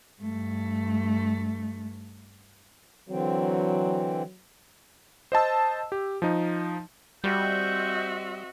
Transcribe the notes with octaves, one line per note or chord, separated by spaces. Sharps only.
G2 A3
D3 E3 F#3 C4
C5 D#5 A5 E6
G4
F3 D#4
G3 C4 F#4 D#5 E5 G6